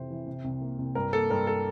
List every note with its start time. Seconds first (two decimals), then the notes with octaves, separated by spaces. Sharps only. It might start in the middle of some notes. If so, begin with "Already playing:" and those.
Already playing: F2 C3 E3 C5
0.10 E3
0.27 C3
0.44 C2
0.61 A#3
0.78 C2
0.95 G2 A#4
1.13 A#3 A4
1.30 G2 A#4
1.47 A4